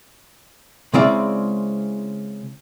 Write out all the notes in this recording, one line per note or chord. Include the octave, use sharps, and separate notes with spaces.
C#3 G#3 C4 E4 D5 F5